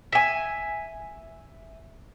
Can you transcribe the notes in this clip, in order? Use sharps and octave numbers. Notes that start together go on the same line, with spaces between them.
E5 G#5